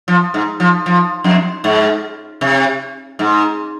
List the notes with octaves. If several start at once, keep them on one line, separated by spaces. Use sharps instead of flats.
F3
G#2
F3
F3
F2
G#2
C3
G#2